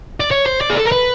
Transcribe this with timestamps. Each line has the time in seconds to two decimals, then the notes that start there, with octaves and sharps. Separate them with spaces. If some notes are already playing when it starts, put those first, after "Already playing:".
0.20 D5
0.31 C#5
0.46 C5
0.61 D5
0.70 G#4
0.77 A4
0.85 A#4
0.92 B4